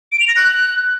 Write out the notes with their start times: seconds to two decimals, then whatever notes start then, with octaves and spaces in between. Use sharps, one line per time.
0.12 D7
0.20 F7
0.28 A#6
0.36 F#6